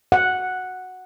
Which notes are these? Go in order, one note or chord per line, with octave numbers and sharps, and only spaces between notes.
F#5